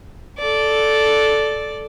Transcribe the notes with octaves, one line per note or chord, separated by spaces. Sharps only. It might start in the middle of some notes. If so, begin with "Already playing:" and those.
A4 D5